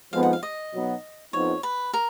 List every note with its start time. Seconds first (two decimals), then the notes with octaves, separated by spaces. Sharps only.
0.13 F2 F3 G#3 B3 D#4 F5
0.23 F#5
0.33 F5
0.43 D#5
0.73 B2 F#3 B3 D#4
1.33 F2 F3 B3 D#4 C#5
1.63 B4
1.93 A#4